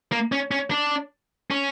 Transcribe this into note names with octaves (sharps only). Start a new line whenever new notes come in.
A#3
C#4
C#4
D4
C#4